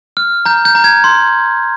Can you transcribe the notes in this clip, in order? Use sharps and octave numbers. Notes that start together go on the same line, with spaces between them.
F6
A#5 G6
G6
A#5
G#6
C6